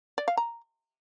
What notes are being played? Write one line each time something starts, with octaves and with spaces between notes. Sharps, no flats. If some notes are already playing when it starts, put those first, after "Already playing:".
D5
F5
A#5